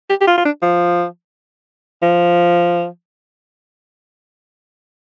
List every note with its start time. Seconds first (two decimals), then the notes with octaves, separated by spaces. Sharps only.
0.09 G4
0.21 G4
0.27 F4
0.38 F4
0.45 D4
0.62 F3
2.02 F3